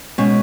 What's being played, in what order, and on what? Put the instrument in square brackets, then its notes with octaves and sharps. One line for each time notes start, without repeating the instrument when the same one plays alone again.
[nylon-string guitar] B2 G#3 [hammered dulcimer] C#4